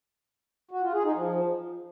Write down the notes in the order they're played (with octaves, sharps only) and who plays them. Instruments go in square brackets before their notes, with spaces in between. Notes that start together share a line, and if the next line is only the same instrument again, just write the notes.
[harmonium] F#4
F4
G#4
D#4
F3